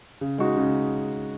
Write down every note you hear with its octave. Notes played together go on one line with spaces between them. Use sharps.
C#3
G#3 D#4 F#4
C#3